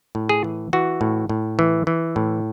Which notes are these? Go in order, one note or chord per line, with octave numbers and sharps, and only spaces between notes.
A2
G#4
E3
E3 F#4
A2
A2
E3
E3
A2